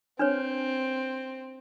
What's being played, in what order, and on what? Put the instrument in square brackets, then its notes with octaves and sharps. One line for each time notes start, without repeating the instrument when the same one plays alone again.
[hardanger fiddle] C4 [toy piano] D4 B4 C#5